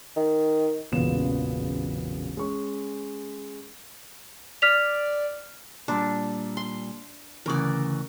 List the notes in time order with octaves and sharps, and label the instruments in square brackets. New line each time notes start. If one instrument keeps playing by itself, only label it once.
[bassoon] D#3
[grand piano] E1 A1 A#2 C#3 B3 E7
G#3 C#4 C#5 C#6
[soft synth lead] D5 [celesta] F6 B6 F7
[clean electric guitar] A#2 G3 [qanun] D4
[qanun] C6
[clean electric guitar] D2 C#3 E3 [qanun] A#4 D5